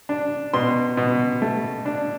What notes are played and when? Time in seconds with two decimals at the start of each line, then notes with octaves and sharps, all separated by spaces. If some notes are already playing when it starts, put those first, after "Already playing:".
0.09 D4
0.54 B2 C6
0.97 B2
1.42 A3
1.86 D4